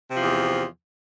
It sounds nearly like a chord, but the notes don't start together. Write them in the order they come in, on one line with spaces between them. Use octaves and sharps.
C3 F3 E2